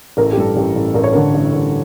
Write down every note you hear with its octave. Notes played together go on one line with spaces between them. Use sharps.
A1 A#4
A4
G4
G2 A4
A1 G4
A1
A1 A#4
C#5
D3 A#4
A1
A1